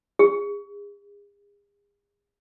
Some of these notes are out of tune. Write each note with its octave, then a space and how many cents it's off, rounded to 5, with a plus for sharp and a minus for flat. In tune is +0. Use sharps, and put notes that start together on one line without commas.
G#4 -40